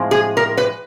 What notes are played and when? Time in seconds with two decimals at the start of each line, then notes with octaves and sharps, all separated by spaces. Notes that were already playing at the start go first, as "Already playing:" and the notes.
Already playing: A2 F3 G#3 C4
0.11 G#4
0.37 A#4
0.57 B4